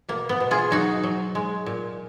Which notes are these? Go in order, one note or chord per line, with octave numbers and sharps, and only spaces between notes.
B2 A#3
B3
B2
F4 G#4
F#3 D#4 F#4
F#3
G#3
A#2